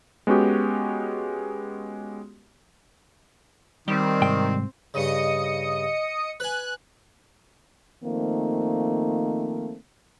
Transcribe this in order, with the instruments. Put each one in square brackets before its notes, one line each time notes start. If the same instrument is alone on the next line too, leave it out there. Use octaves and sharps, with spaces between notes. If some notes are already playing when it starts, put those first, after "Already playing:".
[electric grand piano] G#3 B3 C#4 F#4 G4
[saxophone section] D#3 [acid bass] G3 [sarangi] C4
[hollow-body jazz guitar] C2 G#2 G5
[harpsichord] G2 C#3 [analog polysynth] D#5 D#6 C#7
[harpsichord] B4 G#5 [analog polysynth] F#6
[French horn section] D#3 F3 A3 A#3 C4 D#4